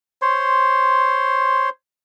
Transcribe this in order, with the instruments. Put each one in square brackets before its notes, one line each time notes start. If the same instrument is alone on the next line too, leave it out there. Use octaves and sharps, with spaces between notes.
[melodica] C5 C#5 C6